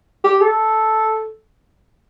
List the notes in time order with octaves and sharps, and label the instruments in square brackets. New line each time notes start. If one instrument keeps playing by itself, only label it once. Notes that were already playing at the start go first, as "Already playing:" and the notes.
[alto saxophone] G4
A4